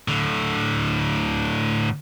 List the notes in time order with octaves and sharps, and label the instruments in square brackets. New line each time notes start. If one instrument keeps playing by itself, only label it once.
[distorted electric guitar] A2 D3